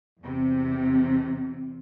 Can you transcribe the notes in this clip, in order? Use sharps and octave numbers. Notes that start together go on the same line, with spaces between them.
E2 C3